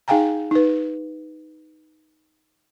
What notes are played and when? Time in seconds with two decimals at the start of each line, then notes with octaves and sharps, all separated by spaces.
0.08 D#4 G#4 F5 G5 G#5 A#5
0.51 D#4 B4